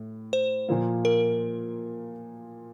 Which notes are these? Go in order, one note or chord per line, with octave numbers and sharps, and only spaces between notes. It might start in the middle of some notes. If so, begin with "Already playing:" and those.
Already playing: A2
C5
A#2 F3 A#3
A#4